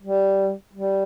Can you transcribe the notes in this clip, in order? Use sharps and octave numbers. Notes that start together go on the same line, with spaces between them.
G3
G3